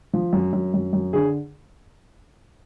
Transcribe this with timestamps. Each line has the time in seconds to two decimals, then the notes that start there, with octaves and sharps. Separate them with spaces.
0.13 F3
0.33 F#2
0.53 F#2
0.74 F#2
0.93 F#2
1.13 D3 G#4